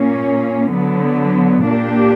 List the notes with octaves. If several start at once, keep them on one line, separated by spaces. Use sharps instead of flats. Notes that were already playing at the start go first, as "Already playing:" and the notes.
Already playing: A#2 A#3 C#4
D3 F#3 B3
A#2 A#3 D4 G4